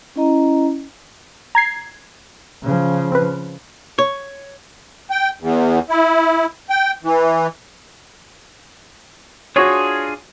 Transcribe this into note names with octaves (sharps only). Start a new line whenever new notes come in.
C#4 E4 D#5 A#5
A#5 G#6 C7
C#3 F3
C4 B4
C#5
G5
E2
E4
G5
E3
D4 F4 F#4 G#4 C#5